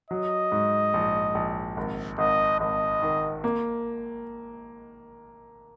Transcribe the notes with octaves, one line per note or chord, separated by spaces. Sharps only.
F#3 D#5
G#2
A#1
A#1
G#1
G#1 D#5
G#1 D#5
D#3
A#3